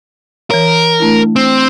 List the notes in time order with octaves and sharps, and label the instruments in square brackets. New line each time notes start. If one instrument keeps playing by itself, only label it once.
[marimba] E3 C#5 [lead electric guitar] A#4
[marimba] A3 D4 E4
[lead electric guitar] C4